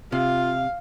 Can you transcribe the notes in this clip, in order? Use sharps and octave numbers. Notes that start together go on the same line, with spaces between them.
C3 F4 F5